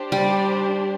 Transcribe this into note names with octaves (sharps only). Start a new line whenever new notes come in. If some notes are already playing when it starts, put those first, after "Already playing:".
Already playing: D4 G4 C5
G3